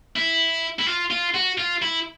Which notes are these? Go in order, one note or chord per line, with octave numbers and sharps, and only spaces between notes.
E4
E4
F4
F4
F#4
F4
E4